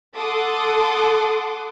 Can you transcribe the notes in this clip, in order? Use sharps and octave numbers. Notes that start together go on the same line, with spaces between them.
A4 F#5 C6 D6 D#6